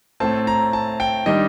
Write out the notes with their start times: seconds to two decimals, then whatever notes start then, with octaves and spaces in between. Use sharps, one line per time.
0.20 A2 A3 C4 A5
0.47 A#5
0.73 A5
1.00 G5
1.26 D#3 G3 D4 D#5